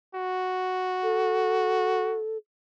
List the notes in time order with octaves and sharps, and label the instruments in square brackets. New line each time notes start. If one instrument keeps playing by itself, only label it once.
[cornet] F#4
[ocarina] A4